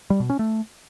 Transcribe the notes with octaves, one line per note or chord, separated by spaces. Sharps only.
G3
B2
C#4
A3